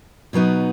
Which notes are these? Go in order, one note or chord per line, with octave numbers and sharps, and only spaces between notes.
B2 F#3 B3 D#4